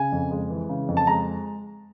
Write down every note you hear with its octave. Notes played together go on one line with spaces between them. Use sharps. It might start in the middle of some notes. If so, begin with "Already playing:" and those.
Already playing: C#3 G#5
F2
G#3
E3
C#3
F2
A5
G#3 A#5